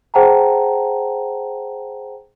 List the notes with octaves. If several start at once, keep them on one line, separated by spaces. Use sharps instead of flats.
G#4 C5 F#5 G5 A5 A#5